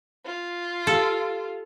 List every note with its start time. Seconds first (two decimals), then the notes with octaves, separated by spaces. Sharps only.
0.26 F4
0.87 G4 A4 F5